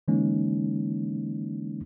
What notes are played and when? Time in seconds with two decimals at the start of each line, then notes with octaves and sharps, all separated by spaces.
0.08 D3 E3 G#3 A#3 C#4 D#4